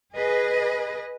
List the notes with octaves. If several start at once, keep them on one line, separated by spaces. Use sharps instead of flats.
G#4 B4 D#5